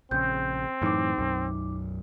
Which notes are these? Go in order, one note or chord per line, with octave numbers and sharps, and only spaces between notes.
A#1 C#3 C4 G6
F#2 A2 E3 D#4 D6
B1 F#2